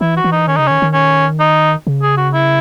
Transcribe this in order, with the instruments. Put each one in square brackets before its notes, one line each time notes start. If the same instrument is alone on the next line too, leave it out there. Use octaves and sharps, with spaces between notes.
[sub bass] E3 [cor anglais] E4
[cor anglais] F#4
[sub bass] E3
[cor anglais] D#4
[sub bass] D#3 [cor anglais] C#4
[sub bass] C#3 [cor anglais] D#4
[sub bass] D#3 [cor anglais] C#4
[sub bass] D#3
[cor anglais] C#4
D#4
[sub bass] C#3
[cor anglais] G#4
F#4
E4